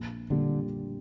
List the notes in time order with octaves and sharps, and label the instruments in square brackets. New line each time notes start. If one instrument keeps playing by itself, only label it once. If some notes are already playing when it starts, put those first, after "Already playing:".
Already playing: [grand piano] A#1
[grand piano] A#2 G3 D4 [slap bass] D3